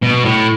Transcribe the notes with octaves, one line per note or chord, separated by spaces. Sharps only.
B2
A2